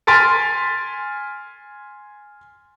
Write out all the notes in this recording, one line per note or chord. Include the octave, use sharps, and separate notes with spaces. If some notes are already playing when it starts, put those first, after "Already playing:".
G#5 C6 F6 A6 B6 D7